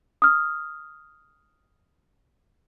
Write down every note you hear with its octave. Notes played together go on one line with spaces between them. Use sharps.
D#6 F6